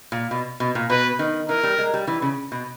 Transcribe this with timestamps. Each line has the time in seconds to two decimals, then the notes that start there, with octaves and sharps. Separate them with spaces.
0.12 A#2
0.31 B2
0.60 B2
0.75 A#2
0.90 B2 B4
1.19 D#3
1.49 E3 A#4
1.63 G3
1.78 G#3
1.94 G3
2.07 E3
2.22 C#3
2.52 B2